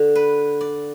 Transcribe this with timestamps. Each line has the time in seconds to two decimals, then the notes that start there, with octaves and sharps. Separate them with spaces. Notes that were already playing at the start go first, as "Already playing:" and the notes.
Already playing: D3
0.15 B4
0.61 D5